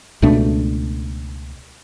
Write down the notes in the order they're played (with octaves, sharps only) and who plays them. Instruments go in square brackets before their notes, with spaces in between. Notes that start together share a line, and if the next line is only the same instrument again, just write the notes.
[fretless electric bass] C#2 B2 A3 D4